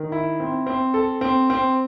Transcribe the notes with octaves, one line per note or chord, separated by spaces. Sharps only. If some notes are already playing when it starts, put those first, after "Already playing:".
Already playing: D#3
E4
C4
C4
A4
C4
C4